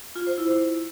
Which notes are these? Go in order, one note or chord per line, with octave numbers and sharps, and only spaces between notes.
F4
C5
E4